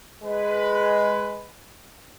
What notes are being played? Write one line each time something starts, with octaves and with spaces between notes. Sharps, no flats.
G#3 B4